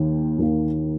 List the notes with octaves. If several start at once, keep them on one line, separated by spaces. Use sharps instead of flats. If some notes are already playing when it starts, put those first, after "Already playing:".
Already playing: D#2 D#3 A#3
D#2 D#3 A#3